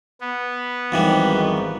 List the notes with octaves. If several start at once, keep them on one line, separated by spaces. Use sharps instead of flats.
B3
G#1 F2 D#3 E3 G3